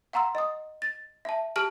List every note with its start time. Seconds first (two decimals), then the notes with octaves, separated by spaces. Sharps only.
0.13 F5 F#5 A#5 C6 E6
0.35 D#5 D#6
0.82 A6
1.25 E5 A5
1.56 G4 A5 F6 D7 F#7